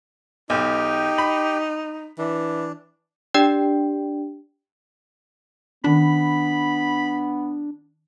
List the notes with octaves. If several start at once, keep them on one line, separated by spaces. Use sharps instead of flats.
B1 D#4 G4 G5
B5
E3 D4
D4 G4 D5 G5
D#3 B3 C#4 D4 B5